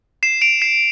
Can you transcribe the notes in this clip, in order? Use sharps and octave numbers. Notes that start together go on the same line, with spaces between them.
C7 E7
D7 F7
C7 E7